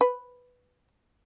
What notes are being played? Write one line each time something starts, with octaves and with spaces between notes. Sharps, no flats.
B4